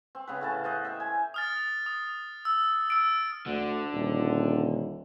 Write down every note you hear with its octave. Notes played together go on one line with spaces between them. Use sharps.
C4
C#3 B3 B4
A2 C#3 A5
C5 D#5 F#5
E5 G5
G#5
D#6 F6 A6
D#6
E6
E6 D7
D2 D3
D#1